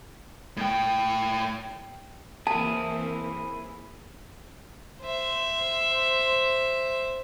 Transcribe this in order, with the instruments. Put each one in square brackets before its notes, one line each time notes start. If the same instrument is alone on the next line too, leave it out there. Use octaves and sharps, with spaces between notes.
[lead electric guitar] A2 G5
[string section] E3 A#3 C4 [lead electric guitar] E4 G#4 [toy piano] A5
[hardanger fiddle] C5 E5